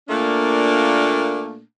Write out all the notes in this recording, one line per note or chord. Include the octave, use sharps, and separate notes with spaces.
A#2 A3 A#3 D4